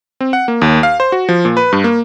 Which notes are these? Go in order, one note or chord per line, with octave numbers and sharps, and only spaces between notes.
C4
F#5
A#3
D#2
F5
C5
F#4
F3
A#2
B4
G2
A#3